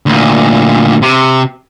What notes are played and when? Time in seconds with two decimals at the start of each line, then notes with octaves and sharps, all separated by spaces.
0.06 D2 A#2
1.02 C3